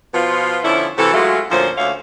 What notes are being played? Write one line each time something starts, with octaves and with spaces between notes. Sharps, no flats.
B2 F3 B3 F4
D3 F3 C#4 E4
C3 E3 F#4 A4
F#3 G#3 A3 F4 F#4
D2 A#2 F3 C#4 C5
D2 D3 A3 C#4 C#5 F5